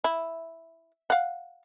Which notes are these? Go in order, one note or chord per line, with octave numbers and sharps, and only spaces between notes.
E4
F5 F#5